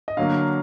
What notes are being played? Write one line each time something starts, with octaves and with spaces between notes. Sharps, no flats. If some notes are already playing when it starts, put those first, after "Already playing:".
D#5
D3 F#3 A#3 F5